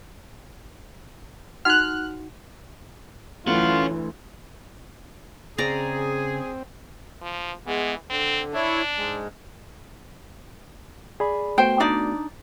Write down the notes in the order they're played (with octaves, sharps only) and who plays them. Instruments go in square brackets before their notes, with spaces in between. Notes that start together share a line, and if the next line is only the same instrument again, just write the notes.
[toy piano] D#4 F#4 F#5 [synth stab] F6 F#6
[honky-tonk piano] D2 [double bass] E3 [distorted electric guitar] C#4 F#5 [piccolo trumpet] F4
[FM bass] C#3 [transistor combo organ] C4 [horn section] G#4 [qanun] D5 A#5
[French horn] F3
[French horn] E3 [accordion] G#3 B3
[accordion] D3 [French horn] C4
[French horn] D4 [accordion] E4 C#5
[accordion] G#2 G#3
[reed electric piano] G#4 D5 B5
[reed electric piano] A3 B3 F#4 [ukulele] C5 G5
[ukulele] D4 D#4 D5